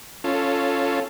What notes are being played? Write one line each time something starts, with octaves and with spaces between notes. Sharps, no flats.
C#4 F4 A4